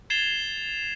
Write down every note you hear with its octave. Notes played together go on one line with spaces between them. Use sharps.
G#6 A6 C7 E7 F7 G7